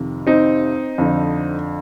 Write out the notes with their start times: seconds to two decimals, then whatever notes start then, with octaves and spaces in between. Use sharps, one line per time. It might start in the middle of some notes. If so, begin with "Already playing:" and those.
Already playing: F2 C3 D#3
0.27 C4 D#4
0.98 F2 D3